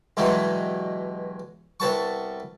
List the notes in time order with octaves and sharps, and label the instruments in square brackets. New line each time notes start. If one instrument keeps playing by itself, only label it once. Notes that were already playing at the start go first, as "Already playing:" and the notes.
[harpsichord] G2 B2 E3 F#3 G#3
C2 B3 A5 C#6